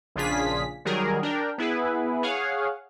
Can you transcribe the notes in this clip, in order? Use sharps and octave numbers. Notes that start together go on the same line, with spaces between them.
A#1 C#3 D4 F4 G#4 B6
D#3 F#3 G3 G#4 A#4
D4 A#4 G5
B3 E4 G#4 B4
G#4 C#5 F5 F#5